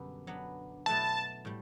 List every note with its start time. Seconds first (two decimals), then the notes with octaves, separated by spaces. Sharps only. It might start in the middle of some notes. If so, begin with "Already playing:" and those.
Already playing: F#2 B2 D3 G3 B3 D4
0.27 F#3 B3 D4
0.86 B2 F#3 A3 E4 B4 A5
1.45 A2 G3